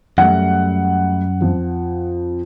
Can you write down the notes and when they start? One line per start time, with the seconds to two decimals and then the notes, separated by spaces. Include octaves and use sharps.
0.18 F#2 G3 A3 F#5
1.41 F2 F3